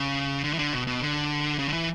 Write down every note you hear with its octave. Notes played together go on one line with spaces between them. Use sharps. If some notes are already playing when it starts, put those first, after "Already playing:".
Already playing: C#3
D3
E3
D3
B2
B2
D3
C#3
D3
E3